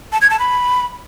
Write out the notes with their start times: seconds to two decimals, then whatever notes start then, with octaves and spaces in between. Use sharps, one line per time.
0.12 A5
0.21 G#6
0.30 A5
0.39 B5